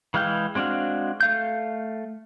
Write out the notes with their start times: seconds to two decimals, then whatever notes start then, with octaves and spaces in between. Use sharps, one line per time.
0.14 E3 G#3 F5 G5
0.55 G#3 C4 D4 F#4 F5
1.21 A3 F5 G6